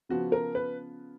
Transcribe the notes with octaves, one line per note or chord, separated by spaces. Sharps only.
C#3 F3 B3 F#4
A#4
B4